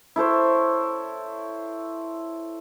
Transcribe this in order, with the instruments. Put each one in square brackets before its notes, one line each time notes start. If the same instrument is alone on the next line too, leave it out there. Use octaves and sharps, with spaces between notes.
[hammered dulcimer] E4 A4 C5 C#5